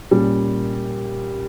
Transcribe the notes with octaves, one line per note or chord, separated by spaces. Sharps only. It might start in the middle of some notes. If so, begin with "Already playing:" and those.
A#2 G3 C#4